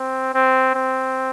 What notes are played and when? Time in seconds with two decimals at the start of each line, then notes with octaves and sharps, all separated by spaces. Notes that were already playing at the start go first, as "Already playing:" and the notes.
Already playing: C4
0.34 C4
0.75 C4